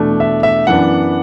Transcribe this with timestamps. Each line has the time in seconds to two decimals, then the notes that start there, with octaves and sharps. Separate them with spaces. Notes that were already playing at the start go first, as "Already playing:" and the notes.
Already playing: E2 B2 A3 D4
0.20 E5
0.43 E5
0.67 F#2 E3 B3 D4 F#5